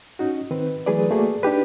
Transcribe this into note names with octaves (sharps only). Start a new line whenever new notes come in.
C#4 D#4 F#4
D#3 C4 B4
E3 F#3 A3 G#4 B4 D5
A3 A#3 F#4 G#4 D5
D4 D#4 G4 B4